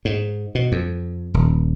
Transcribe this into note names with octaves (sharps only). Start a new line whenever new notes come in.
G#2
B2
F2
D#1